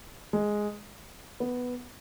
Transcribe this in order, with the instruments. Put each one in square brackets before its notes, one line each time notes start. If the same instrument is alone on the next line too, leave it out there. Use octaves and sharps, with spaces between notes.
[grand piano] G#3
B3